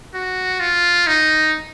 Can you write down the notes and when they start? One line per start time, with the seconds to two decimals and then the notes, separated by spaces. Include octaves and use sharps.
0.15 F#4
0.60 F4
1.07 D#4